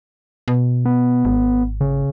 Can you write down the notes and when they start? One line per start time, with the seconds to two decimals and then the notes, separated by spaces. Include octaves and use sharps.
0.48 B2
0.85 B3
1.25 G#1
1.81 C#3